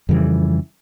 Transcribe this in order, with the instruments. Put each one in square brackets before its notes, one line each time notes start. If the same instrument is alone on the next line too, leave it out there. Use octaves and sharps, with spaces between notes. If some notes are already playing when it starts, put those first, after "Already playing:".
[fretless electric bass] F2 C#3 E3 G3